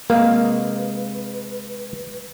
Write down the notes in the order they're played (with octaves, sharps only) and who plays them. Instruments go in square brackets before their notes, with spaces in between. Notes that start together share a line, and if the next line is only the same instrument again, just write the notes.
[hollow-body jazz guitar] C3 G#3 F5 [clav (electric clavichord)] A#3 [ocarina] B4